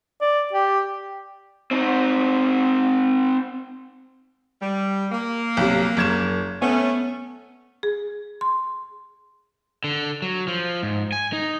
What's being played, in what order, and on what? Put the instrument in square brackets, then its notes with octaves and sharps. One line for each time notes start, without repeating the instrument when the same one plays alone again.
[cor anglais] D5
G4
[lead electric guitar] C4 D#4
[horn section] G3
A#3
[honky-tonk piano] B1 C3
F#1 G#6 E7
[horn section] A3 C#4 [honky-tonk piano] B3
[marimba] G#4
C6
[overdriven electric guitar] D3
F#3
F3
G#2
G#5
D#4